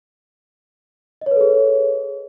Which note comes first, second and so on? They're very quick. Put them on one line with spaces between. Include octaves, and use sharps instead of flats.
D#5 C#5 B4 A4 G#4